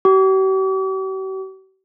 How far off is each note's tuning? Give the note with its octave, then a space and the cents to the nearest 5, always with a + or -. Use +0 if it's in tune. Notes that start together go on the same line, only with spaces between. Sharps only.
G4 -45